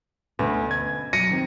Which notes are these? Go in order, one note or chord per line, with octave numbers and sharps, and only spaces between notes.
D2 B2 C#4 B4
G#6
F#3 A#6 C#7 D#7
D#3 C4 D#4